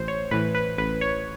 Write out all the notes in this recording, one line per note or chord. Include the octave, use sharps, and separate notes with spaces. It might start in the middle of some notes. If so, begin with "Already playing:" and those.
Already playing: A1 C5
C#5
A2 E3 B4
B4
A1 B4
C#5